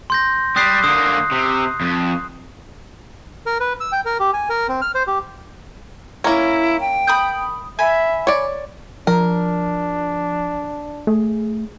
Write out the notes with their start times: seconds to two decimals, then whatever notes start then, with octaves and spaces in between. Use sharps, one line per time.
0.10 C6 G6 A#6
0.56 G3 D#6 F#6 C7
0.84 D3 A#3 D#6
1.32 C3
1.81 F2
3.46 A#4
3.60 B4
3.81 E6
3.92 G5
4.05 A#4
4.20 G4
4.33 G#5
4.50 A#4
4.69 C4
4.82 F6
4.95 C5
5.07 G4
6.24 A#3 C#4 E4 A#5
6.80 G5
7.07 B5 D#6 G6
7.79 E5 G#5 B5
8.27 C#5 D5
9.07 F3 D4 A#4
11.07 A3 G#4